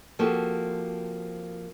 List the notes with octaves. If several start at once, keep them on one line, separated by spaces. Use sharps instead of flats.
F3 A#3 C4 F#4 G4 A4